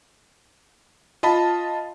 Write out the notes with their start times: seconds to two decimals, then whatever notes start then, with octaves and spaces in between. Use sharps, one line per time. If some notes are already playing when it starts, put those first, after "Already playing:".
1.23 F4 D#5 A5 B5